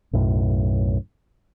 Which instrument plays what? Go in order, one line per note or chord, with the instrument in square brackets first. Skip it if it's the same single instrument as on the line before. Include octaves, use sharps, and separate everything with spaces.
[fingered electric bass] B1 F#2 A2